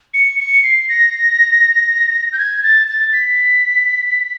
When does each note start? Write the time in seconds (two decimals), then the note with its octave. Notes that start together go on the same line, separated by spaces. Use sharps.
0.14 C#7
0.40 C#7
0.63 C7
0.89 A#6
2.32 G6
2.38 G#6
2.63 A6
2.88 A6
3.13 B6